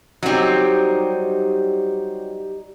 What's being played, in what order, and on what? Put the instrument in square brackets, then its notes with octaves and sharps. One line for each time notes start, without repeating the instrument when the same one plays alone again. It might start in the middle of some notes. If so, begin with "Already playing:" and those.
[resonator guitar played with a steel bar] F#3 C4 [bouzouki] G3 D#4